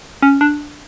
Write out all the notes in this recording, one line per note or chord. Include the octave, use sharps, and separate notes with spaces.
C#4
D4